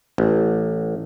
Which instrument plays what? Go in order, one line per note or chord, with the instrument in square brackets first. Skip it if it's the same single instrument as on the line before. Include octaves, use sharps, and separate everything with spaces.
[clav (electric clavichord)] A1